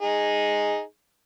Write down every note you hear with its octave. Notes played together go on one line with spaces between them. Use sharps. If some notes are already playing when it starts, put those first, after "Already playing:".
D#4 G#4